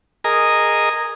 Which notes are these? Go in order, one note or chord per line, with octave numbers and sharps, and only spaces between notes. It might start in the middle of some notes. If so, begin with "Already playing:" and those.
G#4 A#4 D#5